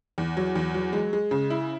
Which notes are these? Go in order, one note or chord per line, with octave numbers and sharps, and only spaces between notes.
E2
F#3
E2
F#3
G#3
G#3
C#3
E4